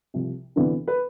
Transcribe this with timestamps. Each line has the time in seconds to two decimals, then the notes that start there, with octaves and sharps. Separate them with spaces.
0.14 C2 C3 F3
0.56 D2 C3 E3 B3 D4
0.88 B4